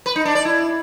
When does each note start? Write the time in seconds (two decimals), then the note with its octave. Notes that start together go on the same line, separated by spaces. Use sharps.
0.06 B4
0.16 D#4
0.25 D4
0.35 D5
0.45 E4